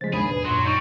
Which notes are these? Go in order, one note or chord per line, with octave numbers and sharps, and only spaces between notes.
C#3 F3 G#3 C5 A6 B6
D#2 G#2 D#3 D4 G#4 B5
B2 B4
F#2 A#2 F#3 C6
G3 D#4 C#6 G6